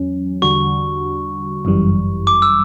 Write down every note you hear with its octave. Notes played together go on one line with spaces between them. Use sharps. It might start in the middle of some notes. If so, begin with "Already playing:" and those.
Already playing: E2 F#3 C#4
E2 D3 G3 D4 F#4 C#6
G1 F#2 E3 G3
D6
E6